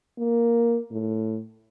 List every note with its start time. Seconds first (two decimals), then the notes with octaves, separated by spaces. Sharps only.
0.18 A#3
0.91 A2